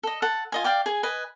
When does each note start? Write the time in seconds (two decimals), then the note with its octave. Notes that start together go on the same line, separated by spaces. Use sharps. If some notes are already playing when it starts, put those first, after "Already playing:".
0.03 A4 D#5
0.22 A4 F#5
0.52 F4 D#5 G#5
0.64 D5 F5 G5 D6
0.86 G#4 G#5
1.03 B4 D#5 G#5